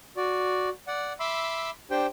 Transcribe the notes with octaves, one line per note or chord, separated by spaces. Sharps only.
F#4 D5
D5 F#5
E5 B5 C6 D6 E6
D4 G4 C5 G5